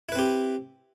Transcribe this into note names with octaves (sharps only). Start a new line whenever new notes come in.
C4 E4 G4 B4